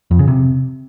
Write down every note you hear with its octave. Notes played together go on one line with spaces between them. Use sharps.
F2
C#3
C3